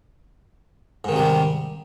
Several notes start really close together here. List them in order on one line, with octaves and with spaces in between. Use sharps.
G#2 D#3 C3 G3